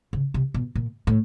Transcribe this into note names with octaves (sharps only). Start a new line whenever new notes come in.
C#3
C3
B2
A#2
A2